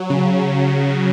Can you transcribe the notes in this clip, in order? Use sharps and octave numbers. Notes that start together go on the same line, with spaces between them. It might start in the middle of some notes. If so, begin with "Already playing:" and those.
Already playing: F#3
C#3